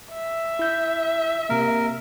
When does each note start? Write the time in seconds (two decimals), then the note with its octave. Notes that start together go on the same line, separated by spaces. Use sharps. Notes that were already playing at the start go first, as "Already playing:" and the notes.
0.14 E5
0.59 E4 G6
1.49 C3 A#3 A#4